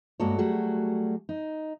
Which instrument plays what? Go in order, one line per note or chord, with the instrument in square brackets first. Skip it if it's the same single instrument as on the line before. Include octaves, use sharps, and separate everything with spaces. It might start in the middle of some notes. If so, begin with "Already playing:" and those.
[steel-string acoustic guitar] G2 G#3 A#3 F#4 A4 C#5
F#3 G3 A3 F#4 G#4
D#4